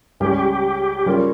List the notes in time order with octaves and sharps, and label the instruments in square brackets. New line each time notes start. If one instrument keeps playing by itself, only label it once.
[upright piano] C#2 C#3 G3 C#4 [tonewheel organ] G4
[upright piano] C#3 G3 A#3 C#4 F4